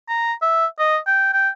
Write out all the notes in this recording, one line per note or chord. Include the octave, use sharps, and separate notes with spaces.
A#5
E5
D#5
G5
G5